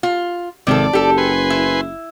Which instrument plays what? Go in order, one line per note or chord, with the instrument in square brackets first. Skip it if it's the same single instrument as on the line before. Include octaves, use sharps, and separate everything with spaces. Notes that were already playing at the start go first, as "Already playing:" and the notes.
[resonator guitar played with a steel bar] F4
[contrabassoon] G#1 [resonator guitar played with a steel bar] C3 F3 A4 [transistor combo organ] D5
[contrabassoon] F#1 [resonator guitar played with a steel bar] G4 A4
[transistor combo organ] B4 G#5 C6
[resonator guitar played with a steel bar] E4